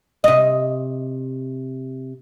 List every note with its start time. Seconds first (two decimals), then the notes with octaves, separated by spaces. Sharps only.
0.24 C3 D#5